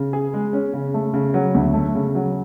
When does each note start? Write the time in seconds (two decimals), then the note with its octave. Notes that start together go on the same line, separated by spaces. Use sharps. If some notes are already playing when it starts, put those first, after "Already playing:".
Already playing: C#3
0.13 G#4
0.34 G#3
0.53 C#4
0.73 C#3
0.94 A3
1.13 C#3
1.34 F#3
1.55 D2
1.74 A3
1.95 C#3
2.15 F#3